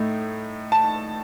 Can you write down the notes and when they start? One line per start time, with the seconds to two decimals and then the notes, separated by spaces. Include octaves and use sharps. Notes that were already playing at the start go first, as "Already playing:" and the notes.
Already playing: A2 A3 D#4
0.72 A5